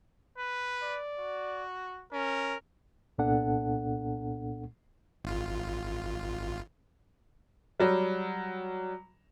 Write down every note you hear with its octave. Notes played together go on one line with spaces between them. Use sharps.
B4
D5
F#4
C#4 A#4
C2 A#2 B3 D4 A4 F#5
G#1 F4
F#3 G3